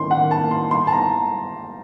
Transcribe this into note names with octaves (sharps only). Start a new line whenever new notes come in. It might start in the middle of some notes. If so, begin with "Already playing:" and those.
Already playing: D#3 C#4 C6
D#3 F#5
A5
A#3
C6
D#4 C6
A5
A#5